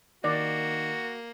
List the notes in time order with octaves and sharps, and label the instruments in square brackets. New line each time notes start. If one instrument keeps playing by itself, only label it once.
[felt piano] D#3 [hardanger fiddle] A#3 [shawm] F#4 [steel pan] D5